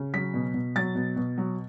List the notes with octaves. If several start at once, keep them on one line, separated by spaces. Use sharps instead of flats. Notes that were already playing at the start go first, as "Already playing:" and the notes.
Already playing: C#3
F#3 B6
B2
B2
F#3 A6
B2
B2
F#3